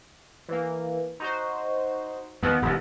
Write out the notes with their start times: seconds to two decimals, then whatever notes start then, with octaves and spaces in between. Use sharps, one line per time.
0.49 E3 A#3
1.20 D#4 F#4 C5
2.43 D#2 B3
2.62 D#1 D#2